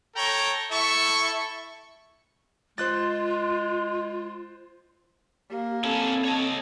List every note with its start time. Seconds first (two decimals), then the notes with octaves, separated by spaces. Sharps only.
0.15 A4 C#5 G5 A#5
0.71 E4 A4 E5 C#6
2.78 G#3 F4 C5 F#6 A6
5.51 A#3 G4
5.84 C4 C#4 E4 A4
6.24 C#5 D#5